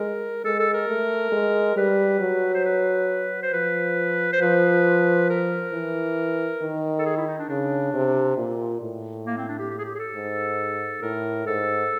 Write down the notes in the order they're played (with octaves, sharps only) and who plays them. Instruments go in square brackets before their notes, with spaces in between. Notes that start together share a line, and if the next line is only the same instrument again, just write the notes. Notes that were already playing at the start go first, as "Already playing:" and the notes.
Already playing: [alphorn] G#3 [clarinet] A#4
[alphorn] G#3 [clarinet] A4
[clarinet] A4
A#4
[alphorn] A3
G#3
[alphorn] G3 [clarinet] B4
[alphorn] F#3
[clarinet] C5
B4
C5
[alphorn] F3 [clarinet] B4
[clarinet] C5
[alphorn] F3 [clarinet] B4
[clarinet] A#4
[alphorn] E3
D#3
[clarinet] A4
G#4
E4
D#4
D4
[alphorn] C#3 [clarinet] D4
[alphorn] C3
A#2
A2
[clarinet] A#3
C4
D4
G4
G4
G#4
G4
G#4
A4
[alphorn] G#2
[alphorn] A2 [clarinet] A#4
[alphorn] G#2 [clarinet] A4